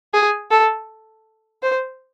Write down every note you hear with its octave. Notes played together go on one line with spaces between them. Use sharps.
G#4
A4
C5